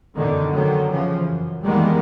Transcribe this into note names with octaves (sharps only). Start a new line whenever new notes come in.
F#2 B2 D3 D#3
D3 D#3 F#3
C#3 E3 F3
F#2
D#3 E3 G3 G#3 A#3 B3